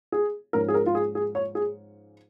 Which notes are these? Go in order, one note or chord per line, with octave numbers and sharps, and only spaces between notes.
G#4
G#2 F3 C#4 A#4
G#4
A#4
F4
G#4
G#4
C#5
G#4